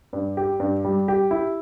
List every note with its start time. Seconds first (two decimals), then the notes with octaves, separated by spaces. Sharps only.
0.13 G2
0.37 G4
0.60 G2
0.85 G3
1.08 G4
1.31 E4